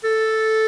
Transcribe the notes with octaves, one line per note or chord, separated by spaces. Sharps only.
A4